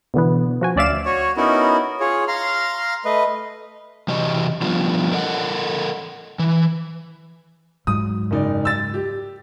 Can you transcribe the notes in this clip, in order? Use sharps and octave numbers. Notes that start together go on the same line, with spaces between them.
B2 D3 E3 B3
F3 F#4 G#5
D2 C#4 D5 E5 F5 E7
F#4 C#5
B3 C#4 D#4 E4 F#4 A#4
F4 G#4 C#5
F5 A#5 C6 F6
A3 B4 D#5
C3 E3 F#3 D#5
F3 G3 B3 D4 F4
A4 A#4 D#5 F5 F#5
E3
G#2 F#3 D#6
F#1 D#4 D5
E6 A6
G4